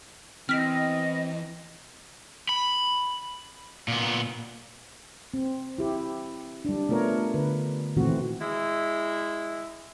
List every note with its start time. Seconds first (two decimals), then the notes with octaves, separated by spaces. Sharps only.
0.49 E3 B3 C4 D#5 F6 B6
2.49 B5
3.88 A#2 B3
5.34 C4
5.78 E4 G4
6.65 G3 D4
6.89 A3 B3 F4 A#4 C#5
7.34 D3 B4
7.96 A#2 D#3 E3 A3 C4 F#4
8.42 G#3 E4